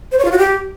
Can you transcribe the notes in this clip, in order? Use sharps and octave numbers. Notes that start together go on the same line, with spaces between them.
C5
C#5
F4
F#4
G4